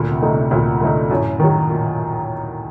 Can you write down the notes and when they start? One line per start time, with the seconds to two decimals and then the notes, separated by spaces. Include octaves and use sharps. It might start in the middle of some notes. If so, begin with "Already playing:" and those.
Already playing: D2 A#2
0.11 C3
0.22 D3 A3 D#4
0.32 C3
0.51 D2 A#2
0.80 D3 A3 D#4
1.10 F#2 A2
1.40 D#3 F#3
1.70 A#2